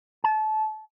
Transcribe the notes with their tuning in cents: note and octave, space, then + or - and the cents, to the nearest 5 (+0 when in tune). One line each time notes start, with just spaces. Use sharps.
A5 -25